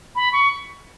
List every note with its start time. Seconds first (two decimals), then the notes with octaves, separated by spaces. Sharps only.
0.16 B5
0.33 C#6